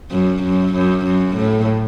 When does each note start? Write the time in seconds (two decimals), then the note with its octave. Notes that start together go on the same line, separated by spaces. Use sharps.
0.11 F#2
0.43 F#2
0.74 F#2
1.05 F#2
1.36 A2